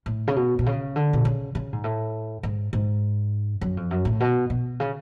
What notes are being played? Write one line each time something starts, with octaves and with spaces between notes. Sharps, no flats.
A2
C#3
B2
B2
C#3
D3
B2
C#3
C#3
G#2
A2
G#2
G#2
F#2
F2
F#2
A2
B2
B2
C#3